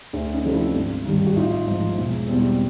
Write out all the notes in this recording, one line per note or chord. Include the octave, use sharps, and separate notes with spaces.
D2 D4
C#4 D#4
C3 F3 A3 C4
D4 E4
G#1
G2 D#3 G3
F#4
A1 D#4 F4
G#2 F3
E1
E2 B2 G3 C4